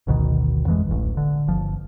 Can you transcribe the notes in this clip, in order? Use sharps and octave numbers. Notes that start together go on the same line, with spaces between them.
G#1 D2 B2 D#3
F2 E3 F#3 G#3
D1 A1
D3
G1 F3